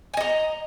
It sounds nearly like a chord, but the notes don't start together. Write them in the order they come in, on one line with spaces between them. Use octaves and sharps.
G#5 D#5 A#5